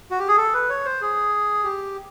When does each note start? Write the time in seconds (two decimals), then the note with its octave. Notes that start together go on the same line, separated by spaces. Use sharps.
0.11 F#4
0.19 G4
0.28 G#4
0.37 A4
0.53 B4
0.70 C#5
0.85 C5
1.01 G#4
1.64 G4